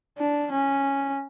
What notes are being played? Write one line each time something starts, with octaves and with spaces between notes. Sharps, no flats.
D4
C#4